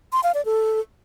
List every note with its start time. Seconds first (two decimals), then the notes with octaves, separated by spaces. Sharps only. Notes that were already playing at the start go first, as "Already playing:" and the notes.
0.12 C6
0.23 F5
0.34 D5
0.45 A4